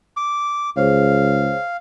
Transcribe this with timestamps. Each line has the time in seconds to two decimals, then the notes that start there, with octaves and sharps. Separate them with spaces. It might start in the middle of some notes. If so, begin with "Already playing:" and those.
0.17 D6
0.77 C#2 G#4 C5 C#5 F5